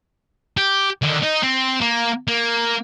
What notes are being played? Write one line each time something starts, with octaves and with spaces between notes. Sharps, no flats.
G4
D3 D#3
D#4
C4
A#3
A#3